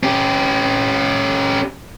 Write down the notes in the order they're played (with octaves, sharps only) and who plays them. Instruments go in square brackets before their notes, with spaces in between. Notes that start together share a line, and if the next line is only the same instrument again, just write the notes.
[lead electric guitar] C#4 G4